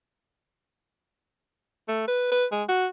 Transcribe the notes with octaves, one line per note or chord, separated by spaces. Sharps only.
A3
B4
B4
G#3
F#4